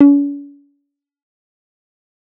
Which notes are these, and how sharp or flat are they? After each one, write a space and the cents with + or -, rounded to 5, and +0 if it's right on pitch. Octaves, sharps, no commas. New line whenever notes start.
C#4 +45